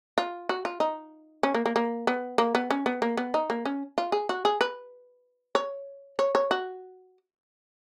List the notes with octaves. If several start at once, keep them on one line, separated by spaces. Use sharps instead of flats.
F4
F#4
F4
D#4
C#4
A#3
A#3
A#3
B3
A#3
B3
C#4
B3
A#3
B3
D#4
A#3
C#4
F4
G#4
F#4
G#4
B4
C#5
C#5
C#5
F#4